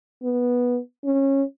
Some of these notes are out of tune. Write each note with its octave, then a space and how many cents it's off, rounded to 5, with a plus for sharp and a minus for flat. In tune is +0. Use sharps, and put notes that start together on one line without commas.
B3 -10
C#4 -20